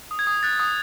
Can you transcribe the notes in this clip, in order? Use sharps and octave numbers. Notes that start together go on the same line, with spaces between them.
D#6
G#6
D#6
F#6 A6
D#6